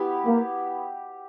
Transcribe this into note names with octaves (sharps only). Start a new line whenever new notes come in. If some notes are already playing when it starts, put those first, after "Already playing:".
Already playing: B3 E4 G4
A#3